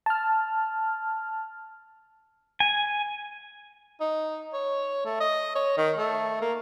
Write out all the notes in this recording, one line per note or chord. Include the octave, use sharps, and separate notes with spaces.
A5 F6
G#5
D#4
C#5
A3
D#5
C#5
D#3
A3
A#3